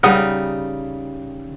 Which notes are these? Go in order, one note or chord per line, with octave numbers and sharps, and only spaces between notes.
C#3 G3 D#4 A#4 F#5 D#6